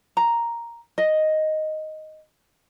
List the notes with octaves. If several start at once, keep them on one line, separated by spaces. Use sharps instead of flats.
A#5
D#5